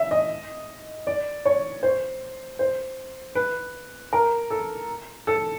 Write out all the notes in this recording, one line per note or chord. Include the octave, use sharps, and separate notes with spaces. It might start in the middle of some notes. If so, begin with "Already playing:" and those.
Already playing: E5
D#5
D5
C#5
C5
C5
B4
A#4
A4
A4